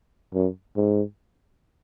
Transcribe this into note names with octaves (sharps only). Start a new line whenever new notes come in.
F#2
G#2